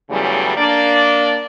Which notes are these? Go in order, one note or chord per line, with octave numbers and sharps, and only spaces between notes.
E2 C#3 E3 F#3 G3 A3
A#3 D4 D5